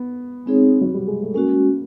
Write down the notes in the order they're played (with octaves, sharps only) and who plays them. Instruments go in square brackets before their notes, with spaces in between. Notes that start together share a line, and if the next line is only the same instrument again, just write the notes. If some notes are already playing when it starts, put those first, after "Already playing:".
Already playing: [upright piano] B3
[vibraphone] G#3 C4 D#4 G#4 C#5
[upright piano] F#3
G3
G#3
A3
[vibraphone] G#3 C#4 F#4 [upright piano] A#3